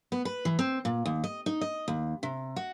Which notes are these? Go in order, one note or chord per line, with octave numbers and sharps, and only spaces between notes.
B3
B4
E3
C4
A#2
D#2
D#5
D#4
D#5
D#2
C3
F#4